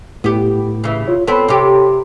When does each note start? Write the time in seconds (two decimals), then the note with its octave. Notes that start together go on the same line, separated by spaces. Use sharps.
0.24 A2 B3 G4
0.84 C#3 E3
1.08 F4 C#5
1.28 B3 C4 A4 C#5 B5
1.49 C3 G4